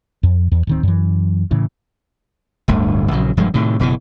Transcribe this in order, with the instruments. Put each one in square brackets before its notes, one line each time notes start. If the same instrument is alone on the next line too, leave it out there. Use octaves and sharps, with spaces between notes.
[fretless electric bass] F2
E2
D1 D#3 C4
F#2 E3
A2 C#3 E3
[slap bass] D1 G1 D2 G2
A#1 C#3 F#3
E1 G2 F3 G#3
A2 C3 D#3
F#1 B2 D#3 E3